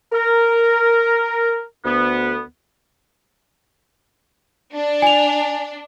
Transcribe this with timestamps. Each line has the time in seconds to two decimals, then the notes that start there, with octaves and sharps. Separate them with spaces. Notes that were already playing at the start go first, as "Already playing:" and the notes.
0.13 A#4
1.84 D2 B3
4.74 D4
5.02 G#5 F7